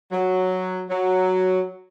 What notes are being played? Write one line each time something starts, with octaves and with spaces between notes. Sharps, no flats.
F#3
F#3